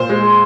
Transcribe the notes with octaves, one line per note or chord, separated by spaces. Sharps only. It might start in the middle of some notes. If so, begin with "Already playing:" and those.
Already playing: A#2 C5
G#3